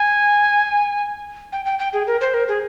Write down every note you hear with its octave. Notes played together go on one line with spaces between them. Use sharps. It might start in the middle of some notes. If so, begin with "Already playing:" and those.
Already playing: G#5
G5
G5
G5
G#4
A#4
C5
A#4
G#4